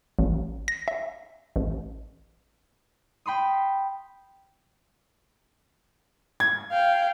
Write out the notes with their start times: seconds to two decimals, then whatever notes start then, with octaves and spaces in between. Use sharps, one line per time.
0.19 A1
0.68 A#6
0.88 E5
1.56 A1
3.26 G5 B5 C6 D#6
6.40 G#6
6.72 F5 G5